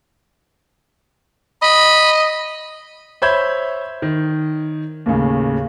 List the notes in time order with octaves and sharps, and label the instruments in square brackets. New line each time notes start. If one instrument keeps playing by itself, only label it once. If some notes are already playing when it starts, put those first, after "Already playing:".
[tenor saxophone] D#5 [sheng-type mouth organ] B5
[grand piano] C5 C#5 E5 B5 G6 G#6
D#3
D#2 A2 C#3